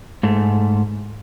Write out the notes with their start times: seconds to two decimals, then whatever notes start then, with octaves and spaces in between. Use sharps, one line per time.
0.23 G#2 A3